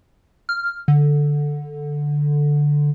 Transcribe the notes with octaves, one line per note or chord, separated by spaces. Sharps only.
F6
D3